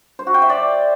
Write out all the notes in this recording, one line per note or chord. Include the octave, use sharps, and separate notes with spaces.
C5
F#4
G5
E5
D5